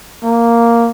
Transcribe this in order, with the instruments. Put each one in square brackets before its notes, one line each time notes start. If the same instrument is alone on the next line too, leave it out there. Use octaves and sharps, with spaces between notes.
[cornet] A#3